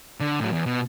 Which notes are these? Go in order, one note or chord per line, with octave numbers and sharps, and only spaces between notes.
D3
A2 F#3
E2
B2